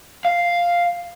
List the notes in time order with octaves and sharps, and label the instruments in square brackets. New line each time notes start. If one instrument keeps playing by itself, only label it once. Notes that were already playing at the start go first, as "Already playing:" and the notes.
[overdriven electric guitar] F5